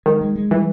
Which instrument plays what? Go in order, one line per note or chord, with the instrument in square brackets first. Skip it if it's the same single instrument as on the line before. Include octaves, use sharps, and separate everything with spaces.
[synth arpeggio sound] D#3 [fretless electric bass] G#3
[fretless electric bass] G#3
G#3
[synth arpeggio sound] E3 [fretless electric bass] G3